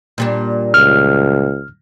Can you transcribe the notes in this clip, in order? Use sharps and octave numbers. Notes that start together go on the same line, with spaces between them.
A#2 G3 D4
C#2 F6